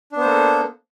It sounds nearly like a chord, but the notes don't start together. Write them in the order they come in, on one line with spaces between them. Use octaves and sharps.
D4 B3 C5 A#3 A4